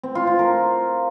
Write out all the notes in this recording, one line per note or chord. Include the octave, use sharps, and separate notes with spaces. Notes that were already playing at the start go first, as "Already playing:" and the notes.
C4
F4
F4
A#4